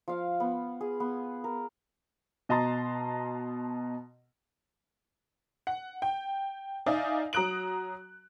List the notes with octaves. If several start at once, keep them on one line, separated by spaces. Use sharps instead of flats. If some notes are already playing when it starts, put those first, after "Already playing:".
F3 F5
B3
G#4
B3
A#4
B2 D#5 A5 A#5 C6 A6
F#5
G5
D#4 D5 E5 F5 G#5
F#3 A#5 D#6 F#6 D7 F#7